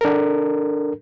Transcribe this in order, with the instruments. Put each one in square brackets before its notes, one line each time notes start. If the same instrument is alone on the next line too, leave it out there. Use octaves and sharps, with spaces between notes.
[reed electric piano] D4 A4 A#4